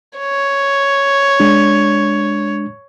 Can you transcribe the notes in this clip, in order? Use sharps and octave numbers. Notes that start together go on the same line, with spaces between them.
C#5
G#3 D4